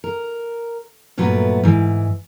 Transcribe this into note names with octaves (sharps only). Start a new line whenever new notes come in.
A#4
G2 A#2 F#3 A3 B3 B4
G#2 E3